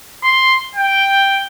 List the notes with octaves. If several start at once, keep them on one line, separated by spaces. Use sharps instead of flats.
C6
G5